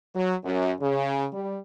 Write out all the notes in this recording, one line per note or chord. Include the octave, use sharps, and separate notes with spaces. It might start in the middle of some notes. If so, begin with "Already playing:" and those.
F#3
F#2
C#3
G3